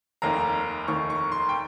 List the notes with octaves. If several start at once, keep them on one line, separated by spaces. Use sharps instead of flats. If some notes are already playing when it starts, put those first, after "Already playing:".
F1 D#2 D#3 A#5
F1 D#2 D#3 C#6
C#6
C6
G5